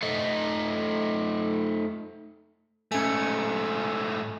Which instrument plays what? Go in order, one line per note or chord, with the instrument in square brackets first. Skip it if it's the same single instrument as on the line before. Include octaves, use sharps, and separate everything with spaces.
[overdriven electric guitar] A3 D#4
[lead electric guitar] G#2 A3 [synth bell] C#4 G#5